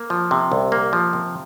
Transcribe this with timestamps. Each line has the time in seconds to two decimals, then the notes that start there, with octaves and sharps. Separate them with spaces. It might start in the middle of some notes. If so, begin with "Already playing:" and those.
Already playing: A#3
0.10 F3
0.31 C3
0.52 C2
0.72 A#3
0.93 F3
1.13 C3